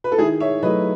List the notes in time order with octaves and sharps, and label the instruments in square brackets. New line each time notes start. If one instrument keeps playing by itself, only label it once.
[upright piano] B4
A4
D#3 E4 G#4
C#5 E5
F#3 A3 B4 D#5